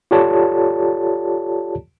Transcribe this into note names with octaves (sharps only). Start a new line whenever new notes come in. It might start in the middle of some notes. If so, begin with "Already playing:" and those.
F4 G4 A4 C#5 D5 A5